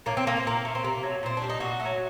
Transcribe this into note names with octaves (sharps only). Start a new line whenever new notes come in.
A2 A#3
C4
A3 A#3
C4
A#2 A#3
A3
C4
C3 A#3
F#3 A3
A#2 C4
G3 D4
D#4
A#2 F#4
A3
F#3